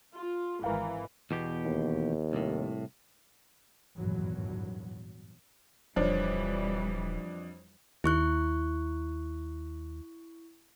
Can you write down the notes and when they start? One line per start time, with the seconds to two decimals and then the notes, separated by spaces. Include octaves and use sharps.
0.14 F4
0.64 G#1 E3 A#4 F5
1.31 E2 B2 G4
1.65 D#2
2.33 C2 A2
3.97 G#1 E2 G2 A#2 F#3
5.96 D#1 F2 E3 G3 D4 C5 C#5
8.04 D#2 E4 C#6 F#6